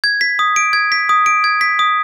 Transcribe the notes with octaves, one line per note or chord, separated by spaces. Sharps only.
G#6
B6
D#6
D7
G#6
B6
D#6
D7
G#6
B6
D#6